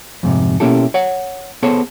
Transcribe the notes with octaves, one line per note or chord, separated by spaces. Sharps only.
F2 G#2 C3
B2 A#3 C#4 E4 G4 A4
C#5 F#5
B3 G#4 A4 C5 C#5